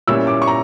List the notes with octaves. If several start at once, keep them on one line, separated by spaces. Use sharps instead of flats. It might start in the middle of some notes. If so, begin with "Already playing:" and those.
A#2 G3 C#4 E4 E6
D6
C#6
A#5